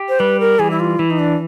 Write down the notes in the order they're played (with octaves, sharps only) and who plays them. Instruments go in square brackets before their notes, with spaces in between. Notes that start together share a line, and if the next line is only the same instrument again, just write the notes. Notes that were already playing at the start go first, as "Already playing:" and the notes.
Already playing: [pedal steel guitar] G4
[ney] C5
[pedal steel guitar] G3 [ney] B4
[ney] A#4
[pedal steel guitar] E3 [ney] G#4
[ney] E4
F4
[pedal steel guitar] E3 [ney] E4
[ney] D#4
D4